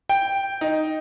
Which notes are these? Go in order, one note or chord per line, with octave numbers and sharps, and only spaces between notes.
G5
D#4